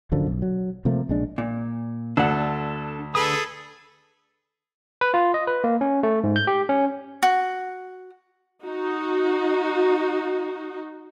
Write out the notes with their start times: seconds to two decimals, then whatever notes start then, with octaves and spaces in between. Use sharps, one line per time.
0.12 D1 F#2 D3 F3
0.26 B1
0.42 F#3
0.85 C3 F3 A3 A#3
1.09 A#1 G#3 D4
1.38 A#2
2.17 D2 D4 A4 F#5
3.15 D3 G#4 A4 B4 D#6
5.01 B4
5.14 F4
5.34 D#5
5.47 B4
5.64 A#3
5.81 C#4
6.03 A3
6.24 G#2
6.36 G6
6.47 G4
6.69 C#4
7.23 F#4
8.64 D#4 F#4